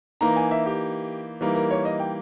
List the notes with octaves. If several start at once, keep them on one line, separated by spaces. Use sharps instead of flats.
E3 A#3 D#4 A#5
G#5
E5
G4
E3 G3 A#3 D#4
A#4
C#5
D#5
G5